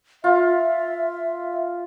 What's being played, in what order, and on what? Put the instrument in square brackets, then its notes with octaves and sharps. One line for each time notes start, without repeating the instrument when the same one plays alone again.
[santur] F4 [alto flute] E5